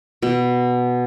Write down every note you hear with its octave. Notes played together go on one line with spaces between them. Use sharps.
B2